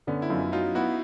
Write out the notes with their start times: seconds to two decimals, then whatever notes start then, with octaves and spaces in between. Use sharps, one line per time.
0.07 D3 B3 C#4
0.22 E4
0.30 F#2 D#4 F4
0.52 F#3 D#4 F4
0.75 B3 E4 F#4